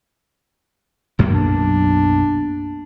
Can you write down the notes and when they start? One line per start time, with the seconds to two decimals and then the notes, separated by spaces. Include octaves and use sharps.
1.19 B1 F#2 A#3
1.34 D4